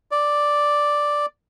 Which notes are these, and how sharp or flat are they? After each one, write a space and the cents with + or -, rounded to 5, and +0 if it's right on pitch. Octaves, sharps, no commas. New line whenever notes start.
D5 +0